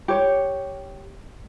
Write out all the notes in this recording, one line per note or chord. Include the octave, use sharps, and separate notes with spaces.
G4 C#5